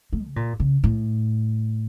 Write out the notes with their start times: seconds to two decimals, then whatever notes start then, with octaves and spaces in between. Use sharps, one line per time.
0.13 A3
0.25 C#3
0.36 A#2
0.60 C#3
0.84 A2